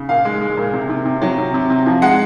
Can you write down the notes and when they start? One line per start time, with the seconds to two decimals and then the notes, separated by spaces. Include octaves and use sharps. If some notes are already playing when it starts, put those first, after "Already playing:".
Already playing: C#3
0.09 A#2 F5
0.25 G#3
0.41 G#3
0.57 A#2
0.73 C3
0.89 C3
1.05 C3
1.22 F#3
1.38 C3
1.54 C3
1.70 C3
1.86 F3
2.02 G#3 F#5